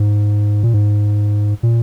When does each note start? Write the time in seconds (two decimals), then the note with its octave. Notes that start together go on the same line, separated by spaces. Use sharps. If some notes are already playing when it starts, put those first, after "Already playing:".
Already playing: G#2
0.63 A#2
0.74 G#2
1.63 A#2